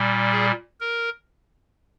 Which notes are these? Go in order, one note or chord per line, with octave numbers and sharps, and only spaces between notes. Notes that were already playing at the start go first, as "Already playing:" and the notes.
Already playing: A#2 G3
G#4
A#4